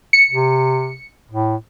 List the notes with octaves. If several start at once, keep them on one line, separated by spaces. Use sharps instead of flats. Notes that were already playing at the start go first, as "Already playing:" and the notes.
C#7
C3
A2